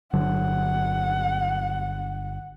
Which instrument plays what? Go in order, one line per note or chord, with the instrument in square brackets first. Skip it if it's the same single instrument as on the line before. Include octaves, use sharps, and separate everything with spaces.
[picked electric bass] G1 D3 F#3 [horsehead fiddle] F#5